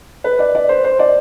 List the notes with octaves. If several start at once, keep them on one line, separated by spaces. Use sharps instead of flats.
B4
D5
D5
C5
C5
D5